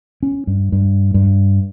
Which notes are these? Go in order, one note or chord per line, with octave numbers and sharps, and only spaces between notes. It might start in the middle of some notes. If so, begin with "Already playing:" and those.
C#4
G2
G2
G2